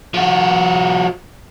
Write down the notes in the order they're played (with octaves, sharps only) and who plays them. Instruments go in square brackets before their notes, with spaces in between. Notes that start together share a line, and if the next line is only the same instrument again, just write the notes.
[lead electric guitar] F3 F#4